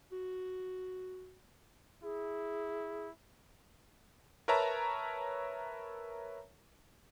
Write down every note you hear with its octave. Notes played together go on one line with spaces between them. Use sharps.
F#4
E4 G#4
A#4 B4 C#5 E5 A5 A#5